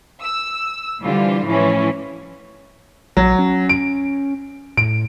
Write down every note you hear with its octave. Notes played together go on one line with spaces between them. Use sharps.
E6
D3 E3 G3 F4 C5
A2 E3 F3 C#4 E4
A#1 F#3
C#4
D7
A2 D7